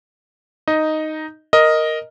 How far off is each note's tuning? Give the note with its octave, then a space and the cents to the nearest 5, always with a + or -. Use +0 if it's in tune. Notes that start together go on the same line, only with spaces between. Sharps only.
D#4 +0 D#5 +0
A#4 +0 D#5 +0